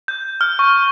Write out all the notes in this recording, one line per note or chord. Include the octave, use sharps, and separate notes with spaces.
G6
F6
C#6